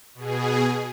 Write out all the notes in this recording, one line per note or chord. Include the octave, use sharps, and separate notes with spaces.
B2 G#4